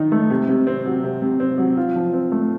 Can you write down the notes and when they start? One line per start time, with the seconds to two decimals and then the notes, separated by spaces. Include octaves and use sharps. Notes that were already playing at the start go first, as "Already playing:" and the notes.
Already playing: D#3 D#4
0.12 A3
0.30 C3
0.49 C3
0.67 C4
0.86 F#3
1.04 C3
1.22 C3
1.40 C4
1.58 F#3
1.77 F4
1.96 F3
2.13 C4
2.32 A3